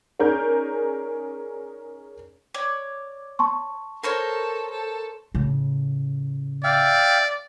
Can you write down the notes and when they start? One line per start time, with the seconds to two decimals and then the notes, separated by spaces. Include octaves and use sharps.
0.19 C#4 D#4 G#4 A#4 D5 G6
2.54 C#5 D5
3.39 A5 C6 C#6
4.03 A4 A#4 C5 C#5
4.71 A4
5.35 A2 C#3
6.64 D5 E5 F5 G5